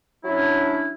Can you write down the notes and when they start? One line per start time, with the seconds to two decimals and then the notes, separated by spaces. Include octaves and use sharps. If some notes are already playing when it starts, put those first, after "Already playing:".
0.25 F#3 C#4 D4 E4